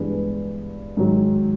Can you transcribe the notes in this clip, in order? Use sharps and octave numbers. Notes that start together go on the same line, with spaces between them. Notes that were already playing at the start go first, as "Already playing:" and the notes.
Already playing: G2 E3 G#3 B3 D4
G#2 D#3 F#3